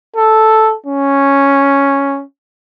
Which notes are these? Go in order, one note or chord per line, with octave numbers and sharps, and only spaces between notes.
A4
C#4